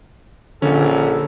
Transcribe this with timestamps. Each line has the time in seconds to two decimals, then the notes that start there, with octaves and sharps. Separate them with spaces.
0.62 A#1 D3 C#4 A4